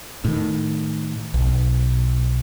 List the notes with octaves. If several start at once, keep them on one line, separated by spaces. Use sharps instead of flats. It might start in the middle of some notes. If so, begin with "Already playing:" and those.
A2 D#3
B1